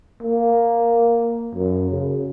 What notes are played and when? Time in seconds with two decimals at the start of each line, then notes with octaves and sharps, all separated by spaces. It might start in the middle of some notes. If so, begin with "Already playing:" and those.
0.23 A#3
1.54 F#2
1.90 C#3